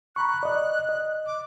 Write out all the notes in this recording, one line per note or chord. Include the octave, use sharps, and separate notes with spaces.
A#5 B5 C#6 F#6
D5 D#5
D#5
D6